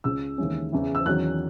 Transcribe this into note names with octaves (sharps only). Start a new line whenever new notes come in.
C#2 C#3 G#3 E6
D#2 C#3 E3 G#3 C#4
E2 C#3 E3
E6
E2 D#3 F#3 C#4 F#6